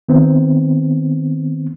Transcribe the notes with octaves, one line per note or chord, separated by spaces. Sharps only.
D#3 B3 C4